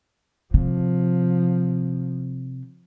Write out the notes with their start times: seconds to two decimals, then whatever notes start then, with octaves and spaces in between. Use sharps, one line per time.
0.54 C3 F3